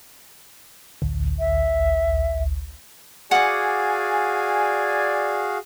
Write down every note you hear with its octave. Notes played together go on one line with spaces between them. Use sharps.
A1 D2
E5
F#4 G#4 D5 F5 F#5 G#5 D6